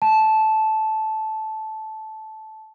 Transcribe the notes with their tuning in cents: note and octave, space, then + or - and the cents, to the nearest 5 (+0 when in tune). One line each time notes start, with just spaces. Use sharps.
A5 -15